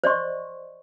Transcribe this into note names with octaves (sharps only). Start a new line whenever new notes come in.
C5 D5 D#5 C6 C#6